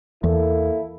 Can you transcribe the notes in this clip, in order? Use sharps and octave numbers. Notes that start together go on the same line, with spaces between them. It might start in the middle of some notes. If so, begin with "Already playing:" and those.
E2 A#3 E4 A4